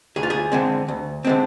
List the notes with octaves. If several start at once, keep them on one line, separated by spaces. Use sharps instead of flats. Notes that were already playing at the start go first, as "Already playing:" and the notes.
D2 G#4
F4
G#4
D3 G#3 C4
D2
D3 G#3 C4